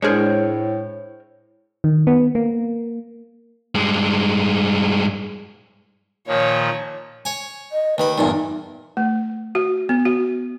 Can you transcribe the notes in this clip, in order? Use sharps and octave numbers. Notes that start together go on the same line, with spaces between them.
A2 G#3 D4 G#4 A#4 C5 C#5
D#3
B3
A#3
G2 G#3
A#2 D#3 F3 C#5
C#5 G#5
D#5
D#2 D#3 B4 B5
E2 G2 A#2 D#4
A3
F#4
B3
F#4